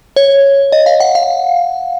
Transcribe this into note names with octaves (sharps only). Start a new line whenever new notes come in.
C#5
D#5
F5
F#5
F5